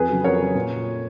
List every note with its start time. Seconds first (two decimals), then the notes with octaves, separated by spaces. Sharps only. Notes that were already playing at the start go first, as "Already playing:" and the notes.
Already playing: F2 G#4 B4
0.09 C#3 F#3
0.24 F2 A#4 C#5
0.40 C#3 F#3
0.55 A#2